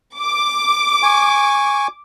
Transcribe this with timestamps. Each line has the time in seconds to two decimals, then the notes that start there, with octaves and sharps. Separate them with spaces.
0.19 D6
1.03 G#5 C#6